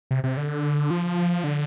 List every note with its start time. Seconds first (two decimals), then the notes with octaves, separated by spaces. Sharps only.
0.11 C3
0.24 C3
0.37 D3
0.90 F3
1.44 D3